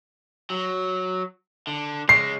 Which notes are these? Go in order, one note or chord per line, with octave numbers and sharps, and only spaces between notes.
F#3
D3
C#3 G#3 C7